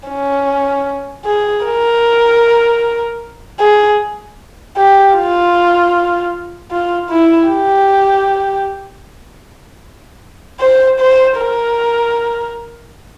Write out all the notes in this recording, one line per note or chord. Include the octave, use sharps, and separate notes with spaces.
C#4
G#4
A#4
G#4
G4
F4
F4
E4
G4
C5
C5
A#4